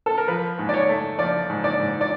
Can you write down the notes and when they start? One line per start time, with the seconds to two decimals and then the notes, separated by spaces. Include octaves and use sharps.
0.06 A4
0.18 A#4
0.28 F3 B4
0.59 G#2
0.69 D5
0.74 C#5
0.89 A3
1.19 F3 D5
1.50 G#2
1.64 D5
1.80 G#2
2.01 D5